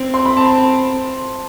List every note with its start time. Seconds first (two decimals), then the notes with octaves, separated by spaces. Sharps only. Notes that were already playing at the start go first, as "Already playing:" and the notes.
Already playing: C4
0.14 C6
0.26 B5
0.37 C4 A5